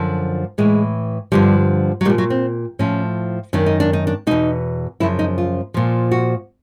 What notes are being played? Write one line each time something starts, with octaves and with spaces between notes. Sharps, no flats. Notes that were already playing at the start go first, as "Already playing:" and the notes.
Already playing: F#2 D3 F3
A2 E3 G#3
G2 D3 F3 G3
F#3
A#2 F3 G3
F#3
C4
A2 F3 C#4
F#2 D#3 D4
D#4
D4
D#4
D4
E2 B2 D#4
F#2 C#3 F3 E4
D#4
F4
A#2 F3
F#4